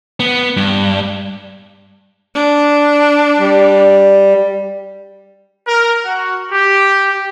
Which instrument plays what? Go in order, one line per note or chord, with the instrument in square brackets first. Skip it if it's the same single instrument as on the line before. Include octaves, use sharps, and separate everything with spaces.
[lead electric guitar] B3
G2
[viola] D4
[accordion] G3
[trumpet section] A#4
F#4
G4